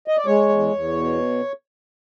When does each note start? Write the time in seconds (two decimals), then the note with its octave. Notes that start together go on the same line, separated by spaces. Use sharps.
0.08 D#5
0.17 D5
0.26 G#3 C#5
0.49 E2
0.73 E2
0.95 B2